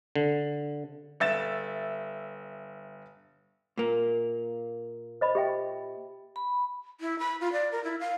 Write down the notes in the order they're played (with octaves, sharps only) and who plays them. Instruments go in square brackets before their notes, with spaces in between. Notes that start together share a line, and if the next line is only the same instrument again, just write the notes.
[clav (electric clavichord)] D3
[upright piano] G1 E5 A6 E7
[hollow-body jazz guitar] A#2 A#3
[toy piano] C5 D#5 B5
G4 E5 G5
[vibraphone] B5
[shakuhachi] E4
B5
F4
D5
A#4
E4
F5